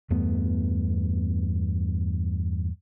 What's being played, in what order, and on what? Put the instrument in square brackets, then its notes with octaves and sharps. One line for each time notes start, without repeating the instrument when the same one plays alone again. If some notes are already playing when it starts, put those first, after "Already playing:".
[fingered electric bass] E2 G2 A3 B3